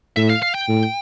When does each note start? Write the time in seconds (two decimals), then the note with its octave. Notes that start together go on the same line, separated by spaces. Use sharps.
0.16 A2 E5
0.30 F5
0.42 F5
0.55 G5
0.68 A2